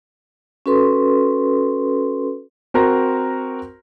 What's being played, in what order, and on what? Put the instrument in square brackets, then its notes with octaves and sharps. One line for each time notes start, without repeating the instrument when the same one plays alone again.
[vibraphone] C#4 F#4 A4 B4 C6
[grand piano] C4 F#4 A#4 A#5 C6 A#6